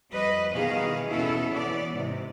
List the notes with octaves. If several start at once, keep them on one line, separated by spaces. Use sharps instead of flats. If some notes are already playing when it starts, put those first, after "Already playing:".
F2 G3 B4 D#5
B2 D#3 E3 B3 G#4 F5
E2 B2 B3 C#4 E4 A4
E3 B3 D5
G#2 C3